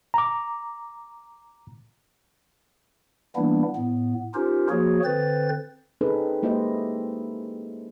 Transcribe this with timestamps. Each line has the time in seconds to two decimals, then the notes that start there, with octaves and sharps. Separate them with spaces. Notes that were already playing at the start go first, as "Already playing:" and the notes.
0.14 A#5 D6
3.36 E3 G3 A#3 B3 D4 E4
3.76 A2 B3
4.35 C#4 D#4 F4 G4 A#4 C5
4.70 F3 A#3 F#4 G#4 C#5
5.04 D3 C4 B4 C5 A6
6.01 C4 C#4 D#4 G#4 A4 B4
6.42 G#3 A#3 E4 G4 C5 D#5